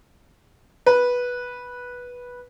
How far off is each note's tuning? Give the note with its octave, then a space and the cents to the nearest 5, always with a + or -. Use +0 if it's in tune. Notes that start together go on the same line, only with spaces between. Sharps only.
B4 -10